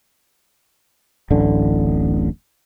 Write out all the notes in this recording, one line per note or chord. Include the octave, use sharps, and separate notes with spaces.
D1 A1 D3